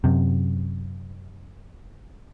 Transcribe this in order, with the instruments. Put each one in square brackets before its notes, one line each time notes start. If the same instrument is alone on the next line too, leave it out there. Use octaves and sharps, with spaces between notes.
[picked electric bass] F#2 C3